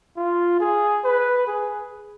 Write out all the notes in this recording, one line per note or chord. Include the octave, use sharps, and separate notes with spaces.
F4
G#4
B4
G#4